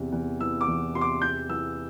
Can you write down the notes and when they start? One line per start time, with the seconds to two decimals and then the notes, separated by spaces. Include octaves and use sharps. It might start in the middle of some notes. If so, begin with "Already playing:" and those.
Already playing: E2 C3
0.12 E2
0.40 E3 E6
0.61 D6
0.67 E2
0.95 C3 C6
1.01 D6
1.22 E2 G6
1.49 E3 E6